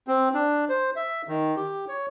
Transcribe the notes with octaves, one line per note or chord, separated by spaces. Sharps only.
C4
D4
C5
E5
D#3
G4
C#5